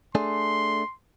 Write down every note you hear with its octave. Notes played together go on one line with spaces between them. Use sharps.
A3 D4 G#4 C6